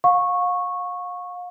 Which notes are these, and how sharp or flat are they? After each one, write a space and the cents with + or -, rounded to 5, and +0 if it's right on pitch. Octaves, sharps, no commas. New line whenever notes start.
F5 +40 C#6 -10